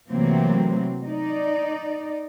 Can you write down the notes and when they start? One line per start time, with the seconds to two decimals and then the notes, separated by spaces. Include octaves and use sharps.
0.11 C3 E3 F#3 A3 A#3 C4
1.05 D#4 D5